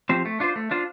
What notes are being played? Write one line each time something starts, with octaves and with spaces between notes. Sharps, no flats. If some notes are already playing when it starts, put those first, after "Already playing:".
F3 C4 G4 C5
A3
D4 F4 C5
A3
D4 F4 C5